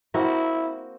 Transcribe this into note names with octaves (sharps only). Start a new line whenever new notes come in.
A#3 C4 E4 F#4